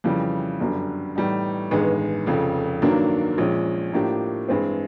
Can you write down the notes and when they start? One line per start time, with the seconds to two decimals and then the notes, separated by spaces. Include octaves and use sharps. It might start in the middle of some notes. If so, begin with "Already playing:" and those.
0.04 F2 C#3 E3 G3
0.60 G1 F#2 D3 G3
1.15 A2 E3 G3 B3 D#4
1.71 A1 G2 D#3 G#3 B3
2.26 F1 F2 C#3
2.82 G2 D#3 F#3 A#3 D4
3.37 A#1 A#2 F3 G#3 C#4
3.93 A2 F3 A#3 D4 G4
4.49 G2 E3 G#3 C4